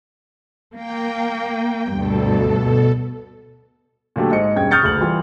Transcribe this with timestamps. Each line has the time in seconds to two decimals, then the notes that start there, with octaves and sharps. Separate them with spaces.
0.75 A#3 G5
1.93 D2 G2 B2 A4
4.16 A#2 D3 F#3 A3 G4 A4
4.31 G#2 C5 D#5 C#7
4.55 E1 G2 C#4 G5 G#6
4.71 C#6 D#6 F6 G6 A6 C#7
4.83 F#1 D2 F#7
5.00 E3 G3 F4